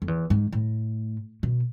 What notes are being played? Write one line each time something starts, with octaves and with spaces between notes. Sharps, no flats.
F2
E2
G#2
A2
B2